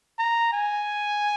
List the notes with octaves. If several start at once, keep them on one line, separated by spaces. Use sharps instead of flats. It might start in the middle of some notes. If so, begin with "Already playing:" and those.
A#5
G#5